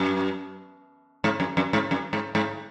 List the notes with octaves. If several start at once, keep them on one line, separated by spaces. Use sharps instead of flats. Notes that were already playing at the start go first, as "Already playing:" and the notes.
Already playing: F#2
G#2
F#2
F#2
G#2
F#2
G#2
G#2